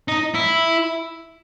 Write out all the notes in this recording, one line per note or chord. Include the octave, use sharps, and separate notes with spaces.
D#4
E4